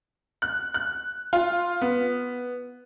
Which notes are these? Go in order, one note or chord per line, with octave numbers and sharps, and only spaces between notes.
F#6
F#6
F4
B3